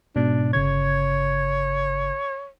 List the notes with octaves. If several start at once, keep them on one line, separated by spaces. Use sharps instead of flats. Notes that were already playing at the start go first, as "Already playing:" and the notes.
G#2 B2 D4
G1 C#3 C#5 G#6